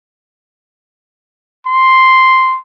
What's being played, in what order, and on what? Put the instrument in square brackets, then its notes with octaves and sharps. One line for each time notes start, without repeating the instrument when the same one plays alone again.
[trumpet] C6